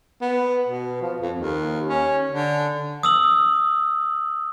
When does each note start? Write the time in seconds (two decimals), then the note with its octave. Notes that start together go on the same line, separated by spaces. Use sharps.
0.22 B3
0.68 B2
1.02 F3
1.21 F2
1.36 D#2
1.88 C#4
2.32 D3
3.03 D#6 E6 F#7